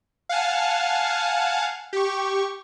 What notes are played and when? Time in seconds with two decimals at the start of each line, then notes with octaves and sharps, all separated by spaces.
0.29 F5 F#5 G#5 A5
1.93 G4 C#6